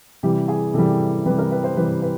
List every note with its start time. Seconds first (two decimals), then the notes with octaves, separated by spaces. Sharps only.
0.23 C3 E3 G3 G4
0.48 G#4
0.74 C3 E3 G3 A4
1.26 C3 E3 G3 B4
1.38 A#4
1.51 B4
1.64 C5
1.77 C3 E3 G3 B4
2.02 B4